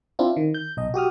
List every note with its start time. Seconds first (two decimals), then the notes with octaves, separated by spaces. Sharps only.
0.19 C4 D4 E4 F4
0.36 D#3
0.54 G6
0.77 B1 D#5
0.94 F#4 G4 D#6 F6